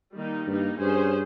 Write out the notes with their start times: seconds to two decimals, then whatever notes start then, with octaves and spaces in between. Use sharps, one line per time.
0.15 D#3 G3 A#3 D#4
0.47 G2 G3 A#3 D#4
0.79 G2 C#4 G#4 C5